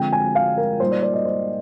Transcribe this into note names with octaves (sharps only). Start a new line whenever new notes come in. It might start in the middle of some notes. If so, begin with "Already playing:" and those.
Already playing: D3 F3 G#3 C4 G5
G#5
F5
A#4
A#2 G3 A#3 D#4 C5
D5
D5
D#5
C5